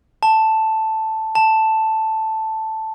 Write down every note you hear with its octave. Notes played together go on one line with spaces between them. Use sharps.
A5
A5